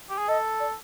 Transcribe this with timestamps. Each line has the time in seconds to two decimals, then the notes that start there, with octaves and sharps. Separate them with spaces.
0.10 G4
0.18 G#4
0.28 A4 D#5
0.60 D5